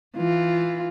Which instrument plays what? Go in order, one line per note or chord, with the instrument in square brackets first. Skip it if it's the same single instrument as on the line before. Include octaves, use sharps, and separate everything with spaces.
[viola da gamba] E3 F4